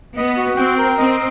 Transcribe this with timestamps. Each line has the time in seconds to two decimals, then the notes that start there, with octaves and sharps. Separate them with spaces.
0.17 B3 D#5
0.37 F#4
0.57 C4 G5
0.78 A#4
0.98 C4 D#5